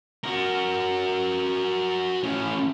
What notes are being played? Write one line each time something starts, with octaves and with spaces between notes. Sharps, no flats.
F#4 A#4
A2 C#4